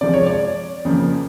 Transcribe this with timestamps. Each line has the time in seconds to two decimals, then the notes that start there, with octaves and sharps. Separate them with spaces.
0.01 C3 F3 G#3 D5
0.14 C#5
0.26 D5
0.85 F2 C#3 F3 A#3